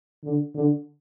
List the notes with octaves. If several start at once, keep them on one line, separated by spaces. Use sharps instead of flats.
D3
D3